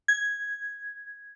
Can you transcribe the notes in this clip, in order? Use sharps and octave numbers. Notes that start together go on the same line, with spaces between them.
G#6